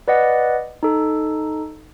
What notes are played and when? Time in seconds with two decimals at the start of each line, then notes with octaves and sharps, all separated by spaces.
0.08 B4 D5 D#5 F#5
0.83 D#4 A4